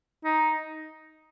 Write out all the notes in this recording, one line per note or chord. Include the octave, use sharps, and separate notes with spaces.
D#4